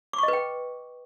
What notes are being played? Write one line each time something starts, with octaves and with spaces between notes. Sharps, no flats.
B4 D#5 G5 C#6 D6